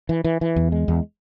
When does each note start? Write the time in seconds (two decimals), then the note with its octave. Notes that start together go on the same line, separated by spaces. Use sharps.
0.09 E3
0.24 E3
0.41 E3
0.56 E2
0.72 G#3
0.88 E2